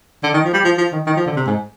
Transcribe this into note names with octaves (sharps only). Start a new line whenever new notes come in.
D3
D#3
F3
G3
F3
F3
D#3
D#3
F3
D3
C3
G#2